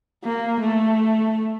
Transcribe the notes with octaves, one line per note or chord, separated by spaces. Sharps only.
A#3
A3